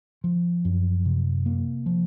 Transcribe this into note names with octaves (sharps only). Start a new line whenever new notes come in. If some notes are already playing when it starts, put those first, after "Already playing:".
F3
F#2
C3
A#3
F3